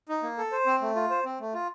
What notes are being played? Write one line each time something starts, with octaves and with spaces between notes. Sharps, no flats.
D#4
A#3
A4
C5
C4
A3
F4
C5
C4
A3
F4